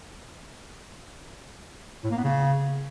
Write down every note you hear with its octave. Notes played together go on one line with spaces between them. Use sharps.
A2
A#3
B3
C#3